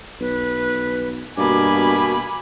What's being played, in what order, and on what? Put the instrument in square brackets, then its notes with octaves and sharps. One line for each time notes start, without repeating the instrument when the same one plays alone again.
[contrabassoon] B1 [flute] B4
[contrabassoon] G2 [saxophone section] B2 A#3 [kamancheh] G#5 B5 [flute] D6